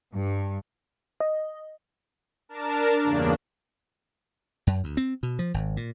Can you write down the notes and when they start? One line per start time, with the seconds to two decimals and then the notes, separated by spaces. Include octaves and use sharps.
0.13 G2
1.20 D#5
2.49 D4 A#4 A5
3.02 E2 G2 C#3 A#3 D4
4.67 F#2
4.84 D2
4.97 C4
5.23 B2
5.39 F3
5.54 G#1
5.77 A#2